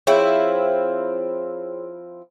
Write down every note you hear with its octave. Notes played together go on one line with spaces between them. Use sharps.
F3 C4 E4 G#4 C#5